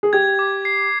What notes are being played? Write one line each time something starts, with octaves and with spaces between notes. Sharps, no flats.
G#4
G4 G#6
D6
C7